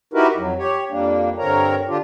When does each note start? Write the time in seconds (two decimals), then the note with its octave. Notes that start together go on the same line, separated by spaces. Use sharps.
0.14 D#4 E4 F#4 G4 A#4 B4
0.36 F2 F#3
0.58 G4 C#5
0.90 F2 G3 A#3 D4
1.38 G2 D3 C4 A#4 C#5 A#5
1.88 D3 D4 F4 G4